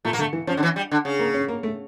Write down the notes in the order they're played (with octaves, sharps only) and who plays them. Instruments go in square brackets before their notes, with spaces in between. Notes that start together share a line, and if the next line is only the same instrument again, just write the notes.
[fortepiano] A#2 [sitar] A3
[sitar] A#3
[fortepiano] D3 [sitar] A3
[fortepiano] E3
[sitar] F3 [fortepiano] C#4
[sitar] D3
E3
G3
D3
C#3
[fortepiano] A#3
C#4
A#3
A3